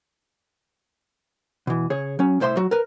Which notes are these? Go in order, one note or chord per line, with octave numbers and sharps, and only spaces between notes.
B2 E3
C#3 G#4 C#5
F#3 C#4
C2 A2 C5 E5 C6
F#3 F#4
A#4 B4